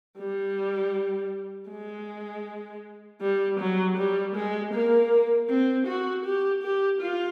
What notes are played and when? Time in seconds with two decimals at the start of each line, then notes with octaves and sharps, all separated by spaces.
0.18 G3
1.70 G#3
3.21 G3
3.59 F#3
3.97 G3
4.35 G#3
4.73 A#3
5.49 C4
5.87 F#4
6.25 G4
6.63 G4
7.01 F4